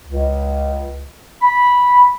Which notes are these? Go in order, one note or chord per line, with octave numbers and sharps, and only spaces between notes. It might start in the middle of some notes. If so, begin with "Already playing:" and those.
C#2
B5